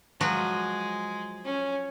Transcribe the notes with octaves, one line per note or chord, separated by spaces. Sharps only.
F3 F#3 G#3 F#4
C#4